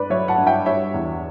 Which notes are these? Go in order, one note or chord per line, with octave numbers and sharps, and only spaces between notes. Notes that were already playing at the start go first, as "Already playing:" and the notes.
Already playing: G2 A3 B4 D5
F#3 C#5 E5
F#5 A5
G2
E5 G5
G3 C#5 E5
E2